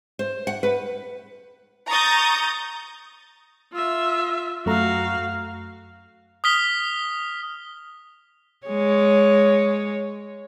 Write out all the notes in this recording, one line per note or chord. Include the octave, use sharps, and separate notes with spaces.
C5
F#5
B4
A#5 C#6 D#6 G6 A6
F4 E5
F#2 A3 F#4 F5 A#5
D#6 F6 B6 G7
G#3 C#5